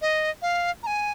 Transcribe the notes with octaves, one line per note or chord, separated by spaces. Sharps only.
D#5
F5
A#5
G#5